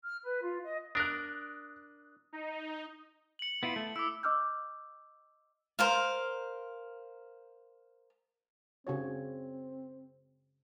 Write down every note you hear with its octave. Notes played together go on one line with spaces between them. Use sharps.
F6
B4
F4
D#5
D4 A#4 D#6 F#6
D#4
C#7 F#7
B3 E4 F4
A3
E4 D6 E6
D#5 D6 E6 F6 G6
A#4 C5 F5
C#3 C4 F#4 C#5